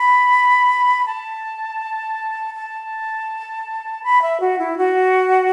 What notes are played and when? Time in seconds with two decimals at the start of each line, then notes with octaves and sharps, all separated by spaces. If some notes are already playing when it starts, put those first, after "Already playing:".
Already playing: B5
1.06 A5
2.54 A5
4.03 B5
4.22 E5
4.40 F#4
4.59 E4
4.77 F#4